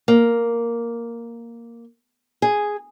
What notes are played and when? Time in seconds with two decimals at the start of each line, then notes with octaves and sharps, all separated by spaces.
0.08 A#3
2.42 G#4